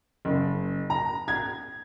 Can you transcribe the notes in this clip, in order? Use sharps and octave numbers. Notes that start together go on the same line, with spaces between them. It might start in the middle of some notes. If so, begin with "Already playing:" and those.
F#1
A#5
G#6